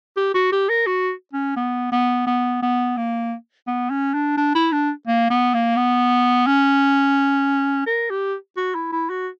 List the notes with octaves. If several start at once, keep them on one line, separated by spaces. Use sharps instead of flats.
G4
F#4
G4
A#4
F#4
C#4
B3
B3
B3
B3
A#3
B3
C#4
D4
D4
E4
D4
A#3
B3
A#3
B3
C#4
A#4
G4
F#4
E4
E4
F#4